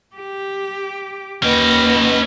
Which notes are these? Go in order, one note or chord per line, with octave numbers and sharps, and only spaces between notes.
G4
D#2 C#4 B4 D#5 F#5 G5